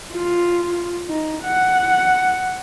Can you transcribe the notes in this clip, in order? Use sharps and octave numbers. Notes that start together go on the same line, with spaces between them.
F4
D#4
F#5